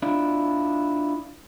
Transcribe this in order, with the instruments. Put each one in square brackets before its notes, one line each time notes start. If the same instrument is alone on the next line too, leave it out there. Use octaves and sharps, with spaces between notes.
[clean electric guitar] D4 E4 F4